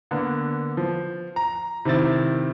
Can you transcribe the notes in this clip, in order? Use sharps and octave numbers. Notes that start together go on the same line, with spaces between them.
D3 A#3 B3
F3
A#5
C3 D#3 C4 E4 A6